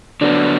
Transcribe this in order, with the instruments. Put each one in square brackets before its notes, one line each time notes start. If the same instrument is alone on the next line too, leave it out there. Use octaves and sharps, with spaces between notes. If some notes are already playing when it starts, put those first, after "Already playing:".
[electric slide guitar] D3 F#3 B3 [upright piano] D4